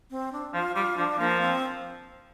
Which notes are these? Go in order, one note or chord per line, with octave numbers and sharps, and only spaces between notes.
C4
D4
F3 F4
G3 F4
F3 D4
F3 A#3
C4